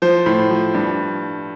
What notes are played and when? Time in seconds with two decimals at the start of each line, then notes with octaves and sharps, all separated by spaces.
0.02 F3 C5
0.26 A2
0.50 F3
0.75 G2